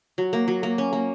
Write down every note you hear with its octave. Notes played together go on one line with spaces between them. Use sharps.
F#3
A#3
F#3
A#3
C#4
A#3